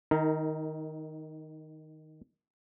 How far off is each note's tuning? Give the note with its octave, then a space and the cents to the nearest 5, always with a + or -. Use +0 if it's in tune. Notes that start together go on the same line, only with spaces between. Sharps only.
D#3 +0 D#4 +30 A#4 -15